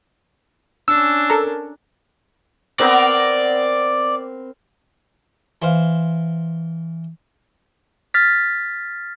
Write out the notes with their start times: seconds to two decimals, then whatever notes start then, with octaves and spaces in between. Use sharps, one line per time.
0.88 C#4 D4 E6
1.30 A4 A#4
2.79 B3 C4 A#4 D5
5.62 E3 C5 F5
8.14 F6 A6 B6